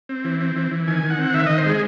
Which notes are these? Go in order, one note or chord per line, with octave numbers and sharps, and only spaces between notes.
C4
E3
C4
E3
E3
D#3 G#5
D#3
F#5
C4
D#3 E5
D#3 D#5
C5
G#3 G#4